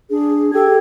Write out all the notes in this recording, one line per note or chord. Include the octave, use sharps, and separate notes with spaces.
D4 G#4
G4 A4 G5 G#6